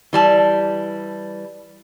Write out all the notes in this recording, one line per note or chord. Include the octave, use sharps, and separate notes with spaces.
E3 G3 A5